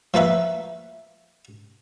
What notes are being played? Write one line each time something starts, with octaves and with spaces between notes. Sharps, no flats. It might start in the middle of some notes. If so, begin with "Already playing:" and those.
F3 A#3 B4 E5